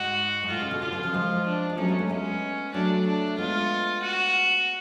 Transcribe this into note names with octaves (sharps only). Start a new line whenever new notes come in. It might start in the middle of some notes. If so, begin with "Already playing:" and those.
Already playing: G#2 F#4
G#2
A2 F4
C#3
B2 D3
B2 D3 F4
B2 D3
C#3 F3
F3 G#3
D4
G#3
F#3 A3 C#4
G#3 B3
F#3 A3
G#3 B3 C#4
F#3 A3 D4
D4
A3
G#3 B3 F4
F#4